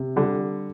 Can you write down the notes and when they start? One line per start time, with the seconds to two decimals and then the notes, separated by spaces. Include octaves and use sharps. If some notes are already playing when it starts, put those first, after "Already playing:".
Already playing: C3
0.16 D3 G3